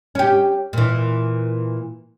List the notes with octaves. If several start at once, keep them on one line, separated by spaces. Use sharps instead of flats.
C#4 G4
A#2 E3